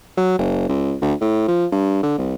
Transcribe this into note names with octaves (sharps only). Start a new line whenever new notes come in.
F#3
F#1
C#2
D2
A2
F3
G2
D3
C2